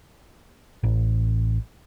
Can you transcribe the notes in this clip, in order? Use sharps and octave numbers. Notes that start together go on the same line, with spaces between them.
A1